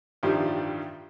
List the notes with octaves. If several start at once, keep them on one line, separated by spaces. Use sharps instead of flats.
A1 G2 D#3 F3 G3 C5